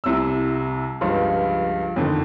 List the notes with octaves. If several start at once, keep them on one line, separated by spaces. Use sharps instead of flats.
C2 C3 E4 E6
C#2 G2 F3
F2 D3 D#3